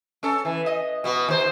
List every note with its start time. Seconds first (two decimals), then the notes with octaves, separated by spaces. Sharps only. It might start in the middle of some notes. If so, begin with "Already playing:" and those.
0.23 C#4 A4
0.45 E3
0.66 D#5
1.04 B2 B3 F#4
1.28 D#2 C5